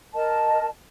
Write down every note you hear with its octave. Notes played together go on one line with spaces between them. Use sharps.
A#4 D#5 A5